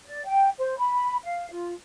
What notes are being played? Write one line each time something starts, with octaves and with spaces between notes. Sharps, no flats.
D5
G5
C5
B5
F5
F4